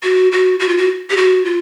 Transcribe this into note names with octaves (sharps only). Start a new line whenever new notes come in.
F#4
F#4
F#4
F4
F#4
G4
F#4
F4